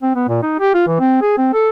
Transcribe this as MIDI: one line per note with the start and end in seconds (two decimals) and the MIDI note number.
0.03 0.12 60
0.16 0.24 59
0.28 0.40 46
0.43 0.58 63
0.60 0.74 67
0.74 0.86 65
0.88 0.97 52
1.00 1.17 60
1.22 1.34 68
1.38 1.53 60
1.53 1.70 69